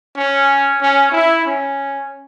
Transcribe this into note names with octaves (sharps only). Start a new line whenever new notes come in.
C#4
C#4
E4
C#4